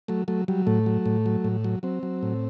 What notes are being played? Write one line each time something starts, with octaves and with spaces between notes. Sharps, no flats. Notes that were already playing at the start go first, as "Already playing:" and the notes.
F#3 A3
F#3 A3
F#3 G3
A2 A3
F#3
A2
F#3
A2
F#3
F#3 C4
F#3
A2